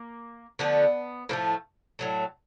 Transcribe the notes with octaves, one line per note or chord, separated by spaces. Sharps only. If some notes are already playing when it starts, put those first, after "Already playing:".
Already playing: A#3
D3 F3 A3 B3
A2 F3 A3 A#3
A2 F#3 A3